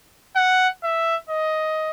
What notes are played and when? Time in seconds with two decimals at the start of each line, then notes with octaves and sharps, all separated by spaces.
0.36 F#5
0.83 E5
1.30 D#5